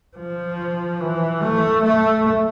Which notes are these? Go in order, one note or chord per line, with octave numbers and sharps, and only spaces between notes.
F3
E3
A3
A3